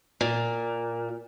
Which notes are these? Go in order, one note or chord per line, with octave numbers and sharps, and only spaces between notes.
A#2